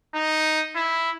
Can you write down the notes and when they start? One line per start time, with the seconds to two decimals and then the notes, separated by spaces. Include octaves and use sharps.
0.15 D#4
0.75 E4